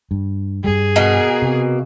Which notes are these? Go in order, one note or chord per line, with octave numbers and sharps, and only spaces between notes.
G2
G2 G3 G#4
B2 A#3
C3